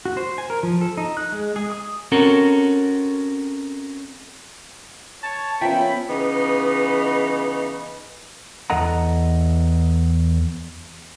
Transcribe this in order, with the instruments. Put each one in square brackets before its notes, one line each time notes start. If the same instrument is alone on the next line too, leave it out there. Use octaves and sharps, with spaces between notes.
[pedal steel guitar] F#4
C5
G#5
A#4
F3
A4
D#4
F#6
G#3
G#4
D#6
[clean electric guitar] C4 C#4 F#4 A4 A#4
[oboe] C#5 [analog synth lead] A5
[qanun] F3 A#4 E5 [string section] B3 C#4 [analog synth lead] G5 [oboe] B5
[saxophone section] C#3 E3 B3 D#4
[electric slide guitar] E2 A4 D#5 F#5 A#5